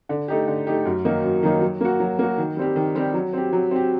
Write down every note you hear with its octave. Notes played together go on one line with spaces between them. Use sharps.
D3
A3 D#4 G4
D3
A3 D#4 G4
F#2
D#3 F#3 A#3 D#4
F#2
D#3 F#3 A#3 D#4
F#3
A#3 F#4
F#3
A#3 F#4
D#3
G3 C4 G4
D#3
G3 C4 G4
F#3
C4 G4
F#3
C4 G4